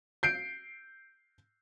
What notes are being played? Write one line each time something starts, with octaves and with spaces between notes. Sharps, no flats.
G6 C7 D7